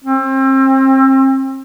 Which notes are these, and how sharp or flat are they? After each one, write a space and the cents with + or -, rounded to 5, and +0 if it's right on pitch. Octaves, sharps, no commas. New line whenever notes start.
C4 +35